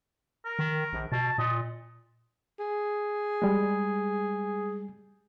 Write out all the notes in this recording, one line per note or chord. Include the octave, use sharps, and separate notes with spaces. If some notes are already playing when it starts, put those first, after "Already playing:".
A#4
D#3
A#1
B2 A5
A#2 D#5
G#4
G3 G#3